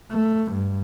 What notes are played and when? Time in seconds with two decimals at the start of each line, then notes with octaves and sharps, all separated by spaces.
0.11 A3
0.52 G2